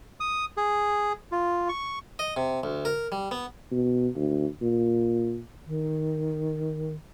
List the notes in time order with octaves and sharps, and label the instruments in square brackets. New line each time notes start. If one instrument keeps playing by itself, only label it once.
[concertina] D#6
G#4
F4
C#6
[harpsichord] D#5
C3
D2
A#4
G3
B3
[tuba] B2
D2
A#2
[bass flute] D#3